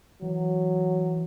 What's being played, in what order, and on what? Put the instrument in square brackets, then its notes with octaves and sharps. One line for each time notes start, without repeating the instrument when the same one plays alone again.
[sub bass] E3 [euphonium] F#3